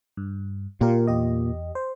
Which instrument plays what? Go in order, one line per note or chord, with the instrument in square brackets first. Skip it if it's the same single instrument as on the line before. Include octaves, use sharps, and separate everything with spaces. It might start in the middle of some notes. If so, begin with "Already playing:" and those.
[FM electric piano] G2
[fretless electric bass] A#2 [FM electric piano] F4 G4 A#4
[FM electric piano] E2 G4 D#5
C5